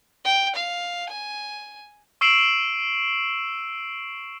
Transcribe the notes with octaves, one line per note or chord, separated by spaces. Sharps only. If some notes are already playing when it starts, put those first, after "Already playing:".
G5
F5
G#5
C#6 E6 C7 D7 E7 F#7